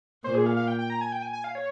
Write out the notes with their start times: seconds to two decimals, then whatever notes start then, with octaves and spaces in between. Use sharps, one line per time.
0.24 A#2 C5
0.35 G#4
0.46 F5
0.57 F5
0.68 G5
0.79 G5
0.90 A#5
1.01 G#5
1.12 G5
1.22 G#5
1.33 G#5
1.44 F5
1.55 C#5